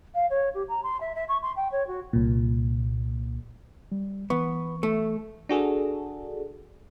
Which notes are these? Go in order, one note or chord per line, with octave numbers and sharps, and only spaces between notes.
F5
C#5
G4
A#5
C6
E5
E5
C#6
C6
G5
C#5
F#4
C2 A#2
G3
E3 B3 C#6
A3
D4 F#4 G#4 A4